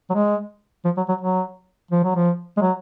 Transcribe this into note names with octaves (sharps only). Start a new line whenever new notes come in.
F#3
G#3
F3
F#3
F#3
F#3
F3
F#3
F3
G#3
F#3